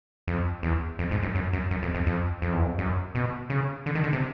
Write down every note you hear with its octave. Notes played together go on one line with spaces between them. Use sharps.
F2
E2
F2
G#2
F#2
F#2
F#2
F#2
F2
F2
F2
F2
E2
F2
F#2
B2
C#3
D3
D#3
D3
C3